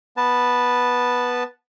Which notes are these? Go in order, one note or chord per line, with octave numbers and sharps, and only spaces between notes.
B3 B4 A5